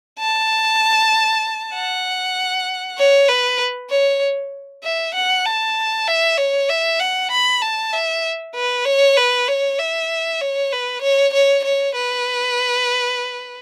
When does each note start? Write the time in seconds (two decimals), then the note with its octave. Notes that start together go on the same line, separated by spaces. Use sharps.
0.19 A5
1.74 F#5
2.98 C#5
3.28 B4
3.90 C#5
4.83 E5
5.14 F#5
5.45 A5
6.07 E5
6.38 C#5
6.69 E5
7.00 F#5
7.31 B5
7.62 A5
7.93 E5
8.55 B4
8.85 C#5
9.17 B4
9.48 C#5
9.79 E5
10.41 C#5
10.72 B4
11.02 C#5
11.33 C#5
11.64 C#5
11.95 B4